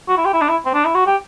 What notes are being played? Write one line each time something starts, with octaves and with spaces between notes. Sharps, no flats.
F#4
E4
G4
E4
D4
E4
C4
D4
E4
F#4
G4